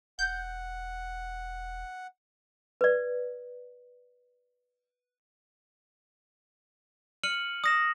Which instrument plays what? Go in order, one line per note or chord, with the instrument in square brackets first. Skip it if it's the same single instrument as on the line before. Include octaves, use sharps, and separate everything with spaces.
[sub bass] E1 [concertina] F#5 [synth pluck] G6
[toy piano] B4 D5
[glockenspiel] F6 C#7 D#7 F#7
D#6 A#6 E7